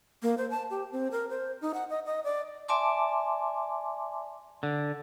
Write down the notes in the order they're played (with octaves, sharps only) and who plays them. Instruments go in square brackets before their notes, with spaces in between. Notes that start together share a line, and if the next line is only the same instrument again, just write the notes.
[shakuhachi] A#3
C5
A5
G4
C4
A#4
C5
D#4
F#5
D#5
D#5
D5
[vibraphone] D5 E5 G#5 A5 C6 D6
[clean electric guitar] D3